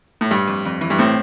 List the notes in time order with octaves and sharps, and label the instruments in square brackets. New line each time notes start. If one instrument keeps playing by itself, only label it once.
[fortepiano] A2
[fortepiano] G2 [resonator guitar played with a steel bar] G3
[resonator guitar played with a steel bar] F2
F2
E3
[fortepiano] G2
[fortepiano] A2 [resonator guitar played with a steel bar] C4